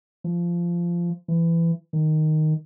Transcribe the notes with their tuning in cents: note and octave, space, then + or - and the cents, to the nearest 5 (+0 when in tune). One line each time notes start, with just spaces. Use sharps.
F3 -15
E3 +20
D#3 -5